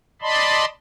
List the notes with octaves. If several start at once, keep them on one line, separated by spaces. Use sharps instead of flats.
D5 D#5 A5 B5 C6